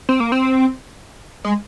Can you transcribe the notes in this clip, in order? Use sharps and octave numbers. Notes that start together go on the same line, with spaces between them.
C4
A#3
C4
G#3